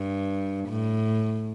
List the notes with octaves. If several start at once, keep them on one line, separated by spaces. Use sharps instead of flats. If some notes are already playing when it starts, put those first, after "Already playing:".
Already playing: G2
A2